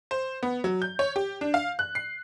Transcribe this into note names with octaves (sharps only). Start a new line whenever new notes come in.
C5
B3
F#3
G6
C#5
G4
D4
F5
F#6
C7